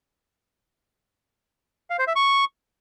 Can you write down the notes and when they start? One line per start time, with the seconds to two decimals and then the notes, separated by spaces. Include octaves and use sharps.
1.90 F5
1.99 C5
2.07 E5
2.16 C#6